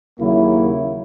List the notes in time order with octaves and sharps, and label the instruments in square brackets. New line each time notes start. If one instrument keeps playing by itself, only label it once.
[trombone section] D#2 C#3 F#3 A#3 E4